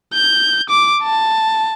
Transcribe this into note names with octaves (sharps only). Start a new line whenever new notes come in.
G6
D6
A5